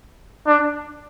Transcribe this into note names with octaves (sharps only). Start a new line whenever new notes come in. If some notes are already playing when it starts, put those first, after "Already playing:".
D4